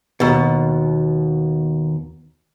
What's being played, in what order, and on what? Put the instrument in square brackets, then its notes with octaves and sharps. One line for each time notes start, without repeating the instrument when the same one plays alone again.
[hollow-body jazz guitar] D#2 B2